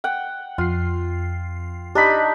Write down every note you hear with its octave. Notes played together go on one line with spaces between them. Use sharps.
F#5 G5
F2 F4 C7
D4 D#4 G4 B5